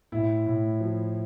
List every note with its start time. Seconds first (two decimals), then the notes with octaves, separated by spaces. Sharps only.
0.12 A2 E4
0.46 A2
0.80 F3